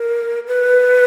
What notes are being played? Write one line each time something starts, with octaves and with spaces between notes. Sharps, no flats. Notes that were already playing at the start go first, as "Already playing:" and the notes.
Already playing: A#4
B4